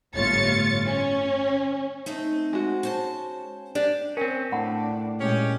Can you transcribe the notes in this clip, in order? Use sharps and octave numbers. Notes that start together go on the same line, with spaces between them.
G1 A2 F4 C#5 A6 C#7
C#4
A3 C4 D#4
G#3 F#4
C#4 C5 A5
D4 G4
C4 C#4 A#4 G5
A2 D4 F#5 B5
A#2 G#3 C#4 G4